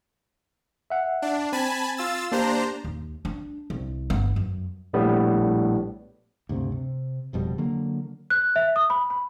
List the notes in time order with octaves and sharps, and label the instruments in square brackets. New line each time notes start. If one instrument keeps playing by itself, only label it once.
[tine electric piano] E5 F#5
[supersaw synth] D4
[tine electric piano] C4 [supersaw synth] G#5 A5 B5
[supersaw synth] F4 E6 A6
[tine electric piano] A#3 G4 [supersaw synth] D4 C5 A#5
[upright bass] D#2
D4
C2
G1 B3
F#2
[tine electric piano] A#1 A2 G3 B3
[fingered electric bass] D2 G2 C3 C4
C3
F#1 F2 B2 G3
D3 F#3 A#3
[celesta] F#6
E5
D#6
B5
B5